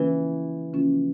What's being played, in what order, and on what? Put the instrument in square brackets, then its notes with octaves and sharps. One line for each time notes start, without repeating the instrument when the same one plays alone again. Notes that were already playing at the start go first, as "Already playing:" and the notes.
Already playing: [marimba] C#3 F3 A#3 C#4 F4 [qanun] E3
[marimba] C#3 F3 A#3 C#4 F4